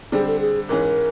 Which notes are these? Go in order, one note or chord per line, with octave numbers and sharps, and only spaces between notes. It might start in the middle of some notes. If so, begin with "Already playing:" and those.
D3 G3 C4 G#4
A4
G#4
G#2 E3 G#3 C#4 A#4